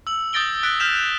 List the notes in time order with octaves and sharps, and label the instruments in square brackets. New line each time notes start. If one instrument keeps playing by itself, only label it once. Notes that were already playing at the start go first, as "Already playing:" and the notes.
[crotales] E6 F#7
D#6 G6 A6 A#6 D7 G7
F#6 A6 B6 D7
E6 F6 G6 B6 E7 F7